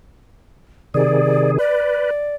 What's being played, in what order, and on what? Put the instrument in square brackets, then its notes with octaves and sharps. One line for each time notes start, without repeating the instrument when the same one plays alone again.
[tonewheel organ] C3 D#3 G#4 [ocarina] D5
[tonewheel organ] B4 [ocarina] D5